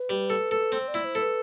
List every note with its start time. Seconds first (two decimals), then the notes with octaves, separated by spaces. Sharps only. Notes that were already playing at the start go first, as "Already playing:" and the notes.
Already playing: B4
0.09 G3
0.30 A4
0.51 A4
0.72 C4 C5
0.88 D5
0.94 E4
1.05 C5
1.15 A4
1.21 B4